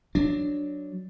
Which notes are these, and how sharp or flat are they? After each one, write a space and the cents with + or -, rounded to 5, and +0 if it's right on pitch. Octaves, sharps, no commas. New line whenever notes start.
F#3 +0 D4 +0